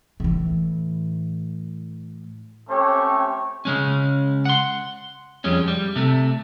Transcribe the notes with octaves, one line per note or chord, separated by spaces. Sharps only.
A2 E3
A3 C4 C#4 G4 C#5
C#3 G#3 C#4
F#5 C6
F2 G3 G#3 C#4
G3
C3 A3